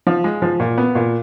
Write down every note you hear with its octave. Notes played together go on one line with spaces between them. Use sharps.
F3
G#3
F3
A#2
B3
A#2